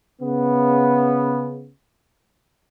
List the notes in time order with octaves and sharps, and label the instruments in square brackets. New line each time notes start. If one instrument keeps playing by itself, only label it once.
[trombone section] C#3 B3